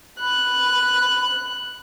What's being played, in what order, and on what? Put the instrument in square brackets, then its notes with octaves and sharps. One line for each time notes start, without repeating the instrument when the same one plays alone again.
[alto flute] B5 [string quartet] F#6